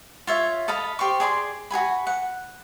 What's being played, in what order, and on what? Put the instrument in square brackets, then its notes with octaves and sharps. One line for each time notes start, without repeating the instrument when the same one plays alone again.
[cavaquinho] F4 C#5 E5
A4 D#5 F5 B5
G4 C5 D5 C#6
G#4 D5 B5 C6
F#4 G#4 G#5 B5
F#5